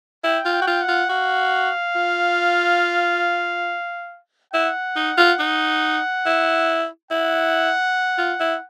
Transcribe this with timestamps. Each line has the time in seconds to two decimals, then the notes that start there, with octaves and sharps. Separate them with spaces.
0.24 E4 G5
0.45 F4
0.53 G5
0.61 F#4
0.67 F4
0.82 F#5
0.88 F4
1.09 F#4 F5
1.95 F4
4.53 E4 F#5
4.96 D#4
5.17 F4
5.39 D#4
6.26 E4
7.11 E4 F#5
8.18 F4
8.40 E4